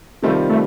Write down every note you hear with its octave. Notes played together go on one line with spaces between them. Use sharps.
C3 D#3 G3 A3 C4 F4
A3